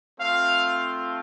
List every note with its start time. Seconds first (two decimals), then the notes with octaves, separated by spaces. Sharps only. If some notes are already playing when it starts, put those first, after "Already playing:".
0.18 A3 C4 F4 F5